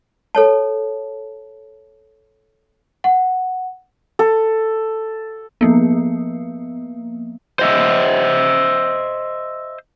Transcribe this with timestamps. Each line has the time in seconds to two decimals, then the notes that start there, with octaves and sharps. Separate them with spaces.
0.35 A4 C#5 A5
3.04 F#5
4.19 A4
5.61 F3 A#3 B3
7.59 C5 D#5 E5